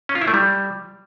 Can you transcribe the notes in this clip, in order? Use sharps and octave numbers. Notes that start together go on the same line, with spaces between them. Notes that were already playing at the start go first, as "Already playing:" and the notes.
C#4
F4
E4
A3
G3